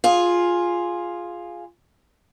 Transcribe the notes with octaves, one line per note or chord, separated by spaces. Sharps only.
F4 G#4